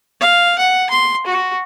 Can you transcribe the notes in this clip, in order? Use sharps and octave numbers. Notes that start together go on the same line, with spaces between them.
F5
F#5
C6
F#4